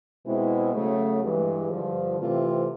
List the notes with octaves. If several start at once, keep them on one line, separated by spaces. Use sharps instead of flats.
B2 G#3 C4 E4
C#3 F#3 A3
G2 E3 G#3
G2 D3 F3
C3 E3 A3 C4 F4